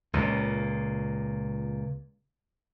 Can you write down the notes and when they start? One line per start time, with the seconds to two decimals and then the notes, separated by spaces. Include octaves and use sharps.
0.13 C#2 A#2